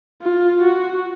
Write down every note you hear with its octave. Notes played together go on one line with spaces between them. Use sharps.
F4
F#4